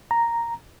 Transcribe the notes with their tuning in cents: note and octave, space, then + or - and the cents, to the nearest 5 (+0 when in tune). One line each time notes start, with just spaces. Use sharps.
A#5 +0